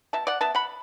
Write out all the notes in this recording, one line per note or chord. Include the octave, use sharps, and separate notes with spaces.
B2 E5 A5
D5 F#5
B3 E5 A5
F#5 B5